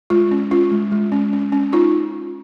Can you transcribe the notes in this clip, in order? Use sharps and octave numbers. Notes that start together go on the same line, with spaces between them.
G#3 F4
C#4
C#4 F4
G#3
G#3
C#4
C#4
C#4
D#4 F4